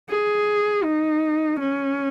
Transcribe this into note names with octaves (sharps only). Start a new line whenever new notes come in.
G#4
D#4
C#4